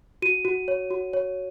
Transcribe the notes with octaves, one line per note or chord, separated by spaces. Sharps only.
F#4 D#7
F#4
C#5
F#4
C#5